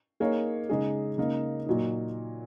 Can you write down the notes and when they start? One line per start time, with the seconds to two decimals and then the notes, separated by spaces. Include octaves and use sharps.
0.20 A#3 D#4 G#4 C#5
0.70 C#3 G#3 D#4 G#4
1.18 C#3 A#3 D#4
1.66 A#2 F#3 D#4